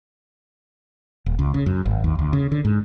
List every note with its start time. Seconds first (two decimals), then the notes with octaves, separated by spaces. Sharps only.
1.26 D#1
1.39 C#2
1.54 C#3
1.66 F#2
1.86 G#1
2.04 D#2
2.19 D2
2.33 C#3
2.52 D3
2.65 G#2